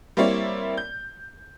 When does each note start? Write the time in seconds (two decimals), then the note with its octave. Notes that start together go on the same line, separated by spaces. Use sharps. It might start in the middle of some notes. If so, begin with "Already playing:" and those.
0.17 G3 A#3 C4 E4 C#5 D5
0.77 G6